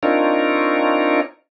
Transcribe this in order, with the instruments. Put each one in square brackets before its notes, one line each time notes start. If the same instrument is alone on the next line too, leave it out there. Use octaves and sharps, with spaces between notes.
[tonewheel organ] C4 D4 D#4 F4 A#4 C#5